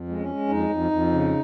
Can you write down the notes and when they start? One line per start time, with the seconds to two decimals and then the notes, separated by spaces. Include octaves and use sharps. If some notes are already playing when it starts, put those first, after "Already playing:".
Already playing: F2
0.09 G#3
0.19 C#4
0.29 G#3
0.49 F2 D#4
0.70 F2
0.91 F2
1.12 C#3